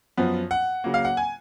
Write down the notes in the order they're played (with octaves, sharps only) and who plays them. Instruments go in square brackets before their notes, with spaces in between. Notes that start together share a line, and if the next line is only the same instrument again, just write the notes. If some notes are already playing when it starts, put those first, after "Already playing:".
[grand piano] F#2 F3 B3
F#5
C#3 F#3 A#3
F5
F#5
G#5